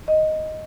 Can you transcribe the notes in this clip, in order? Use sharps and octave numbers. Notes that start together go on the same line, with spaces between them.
D#5